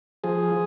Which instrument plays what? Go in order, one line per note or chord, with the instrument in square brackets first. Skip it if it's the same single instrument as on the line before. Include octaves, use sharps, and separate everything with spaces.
[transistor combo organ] F3 G#4